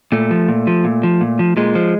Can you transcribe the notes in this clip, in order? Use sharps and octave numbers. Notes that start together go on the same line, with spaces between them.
A#2 A3
F3
A#2
F3
A#2
F3
A#2
F3
A#2 G#3
F3